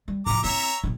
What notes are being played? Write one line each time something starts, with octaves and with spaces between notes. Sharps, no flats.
G3
A2 F3 A#5 D6
C4 E4 C#5 E5 A#5
D1 A#1